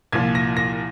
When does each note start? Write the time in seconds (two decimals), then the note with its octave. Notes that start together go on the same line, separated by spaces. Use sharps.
0.12 C2 A#2 F3 G#6
0.35 A#6
0.57 A#6